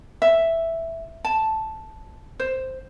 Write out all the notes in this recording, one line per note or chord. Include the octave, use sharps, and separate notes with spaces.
E5
A5
C5